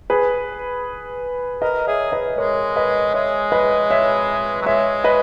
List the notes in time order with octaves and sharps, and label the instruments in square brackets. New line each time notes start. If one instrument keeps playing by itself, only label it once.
[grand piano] G#4 B4
[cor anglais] A#4 [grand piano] B4 D#5
[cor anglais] G#4 [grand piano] C#5 E5
[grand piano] B4 D#5
[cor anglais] G#3 [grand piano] A#4 C#5
[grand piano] B4 D#5
[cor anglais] G#3 [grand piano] C#5 E5
[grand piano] B4 D#5
C#5 E5
[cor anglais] F#3
[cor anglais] G#3 [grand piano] C#5 E5
[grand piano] B4 D#5